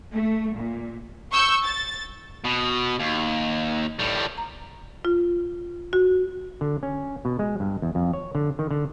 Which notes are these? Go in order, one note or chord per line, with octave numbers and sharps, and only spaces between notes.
A3
A#2
C#6 E6 G6 C#7
A6
B2
D#2
A2 G3
A#5
F4
F#4
D3
C#4
B2
G#3
G2
E2
F2
C#5
D3
D#3
D3